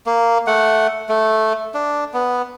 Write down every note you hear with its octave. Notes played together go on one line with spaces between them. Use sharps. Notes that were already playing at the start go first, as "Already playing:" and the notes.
A#3
A3 F#5
A3
D4
B3